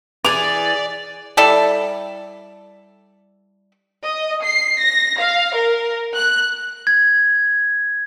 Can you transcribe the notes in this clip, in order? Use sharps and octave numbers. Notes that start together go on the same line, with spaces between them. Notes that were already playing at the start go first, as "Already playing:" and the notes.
E3 G#4 D5 D6 F7
G3 E4 A4 D5
D#5
C7
A#6
F5
A#4
F#6
G#6